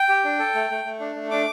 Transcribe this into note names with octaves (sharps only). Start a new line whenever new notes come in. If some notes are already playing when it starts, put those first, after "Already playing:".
Already playing: G5
G4
D4
A4
A3
A3
A3
D4
A3
D4 D6